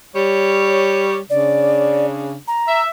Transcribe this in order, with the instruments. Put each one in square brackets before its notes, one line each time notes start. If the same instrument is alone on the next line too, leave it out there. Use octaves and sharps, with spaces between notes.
[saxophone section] G3 C#5
[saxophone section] C#3 D4 [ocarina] D5
[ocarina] A#5
[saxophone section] E5